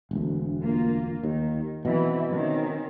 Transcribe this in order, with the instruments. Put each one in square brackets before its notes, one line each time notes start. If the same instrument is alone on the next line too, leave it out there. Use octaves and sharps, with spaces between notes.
[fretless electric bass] E1 D2
[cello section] A#3 F4
[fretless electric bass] D#2 [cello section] D#3
[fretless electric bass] B2 [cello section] E3 C4 E4
[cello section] D#3 C4 C#4